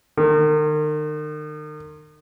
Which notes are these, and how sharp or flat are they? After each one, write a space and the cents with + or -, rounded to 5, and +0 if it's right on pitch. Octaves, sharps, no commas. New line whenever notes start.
D#3 -40